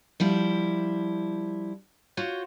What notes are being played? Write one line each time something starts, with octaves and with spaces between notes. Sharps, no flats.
F3 G3 E4
F4 F#4 C5 C#5